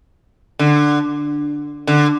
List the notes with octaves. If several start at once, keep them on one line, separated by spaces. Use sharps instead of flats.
D3
D3